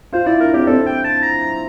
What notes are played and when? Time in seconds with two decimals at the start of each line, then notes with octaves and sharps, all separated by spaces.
0.13 F4 C5
0.26 E4 D5
0.40 D4 A#4
0.54 C4 G4
0.67 C4 A4
0.86 G5
1.04 A5
1.23 A#5